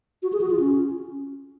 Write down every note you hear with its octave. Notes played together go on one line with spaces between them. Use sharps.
F#4
G#4
F#4
F4
C#4